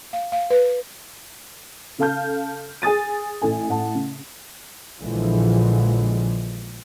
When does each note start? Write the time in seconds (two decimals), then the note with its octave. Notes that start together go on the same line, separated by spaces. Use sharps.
0.13 F5
0.32 F5
0.50 B4
1.98 C#3 A4 F5 A5 F6 G6
2.82 G#4 G#5 D#6 A6 D#7
3.42 A1 A2 A4 G#5
3.69 A2 F#5 A5
3.94 C#3
5.00 A#1 A#2 D3 E3 F3 G#3